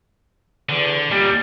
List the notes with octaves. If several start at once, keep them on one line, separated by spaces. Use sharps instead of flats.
E2 D3
D#2 A#2 G3